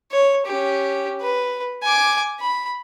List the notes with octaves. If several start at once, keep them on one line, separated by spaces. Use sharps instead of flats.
C#5
C#4 G4
B4
G#5 D6
B5